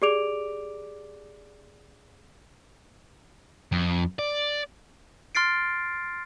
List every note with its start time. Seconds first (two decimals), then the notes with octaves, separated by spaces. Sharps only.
0.02 G4 G#4 D5 D6 D7 F7
3.72 F2
4.19 D5
5.35 C6 F6 A6 C7 D7